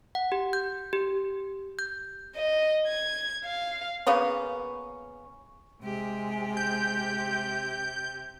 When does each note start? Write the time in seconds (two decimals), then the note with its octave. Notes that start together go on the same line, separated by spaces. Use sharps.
0.15 F#5
0.32 G4
0.53 G6
0.93 G4
1.79 G6
2.36 D#5
2.87 G#6
3.45 F5
4.07 C#3 A#3 B3 C#4
5.82 C3 G#3 G4
6.57 G6